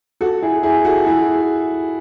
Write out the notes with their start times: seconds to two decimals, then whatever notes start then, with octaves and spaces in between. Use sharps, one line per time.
0.21 F#4 A4
0.42 E4 G#4
0.63 E4 G#4
0.84 F#4 A4
1.07 E4 G#4